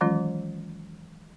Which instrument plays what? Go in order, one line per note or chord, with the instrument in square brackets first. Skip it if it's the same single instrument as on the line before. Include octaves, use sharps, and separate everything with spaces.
[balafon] D#3 E3 F#3 G#3 C#4 F4